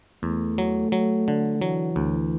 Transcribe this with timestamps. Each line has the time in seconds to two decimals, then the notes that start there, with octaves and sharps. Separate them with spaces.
0.23 E2 A3
0.58 F#3
0.92 F#3
1.28 D3
1.61 E3 F#3
1.96 D2